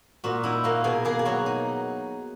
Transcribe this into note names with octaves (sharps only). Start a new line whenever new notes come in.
A#2 F#4
D#4 E4
A#3 F#4
B2 G#4
A#3 G#4
G#4
F#3 F#4
D#4